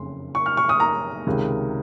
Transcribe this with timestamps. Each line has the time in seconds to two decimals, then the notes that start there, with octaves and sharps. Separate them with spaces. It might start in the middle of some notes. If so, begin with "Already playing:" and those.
Already playing: F#1 F2 C#3 C6
0.35 C#6
0.46 F6
0.57 C#6
0.69 D#6
0.80 A#5
1.27 C#2 C3 D#3